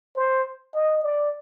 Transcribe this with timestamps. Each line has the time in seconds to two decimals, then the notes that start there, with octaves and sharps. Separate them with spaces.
0.16 C5
0.74 D#5
1.03 D5